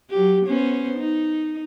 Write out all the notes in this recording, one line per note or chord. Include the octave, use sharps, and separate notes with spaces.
F#3 G4
B3 C#4 C5
D#4